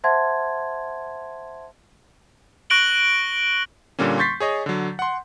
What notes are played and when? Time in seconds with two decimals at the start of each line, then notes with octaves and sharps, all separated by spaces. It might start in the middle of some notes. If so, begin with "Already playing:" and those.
0.04 C5 E5 F#5 A5 C6 G#6
2.70 C#6 F#6 A#6 D7 F#7 G7
3.99 A#2 D3 G3 A#3 C#4
4.18 C6 C#6 G6 A6 B6 C7
4.40 G#4 C#5 D#5
4.66 D3 F#3
4.99 F#5 C6